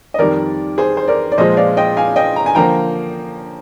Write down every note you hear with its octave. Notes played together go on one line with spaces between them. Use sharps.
D#5
F2 D#3 G3 A#4 D5
G#4 C5
C5
A#4 D5
D5
A#2 F3 G#3 C5 D#5
D5 F5
D#5 G5
F5 G#5
D#5 G5
A#5
G#5
D3 F3 A#3 G5 A#5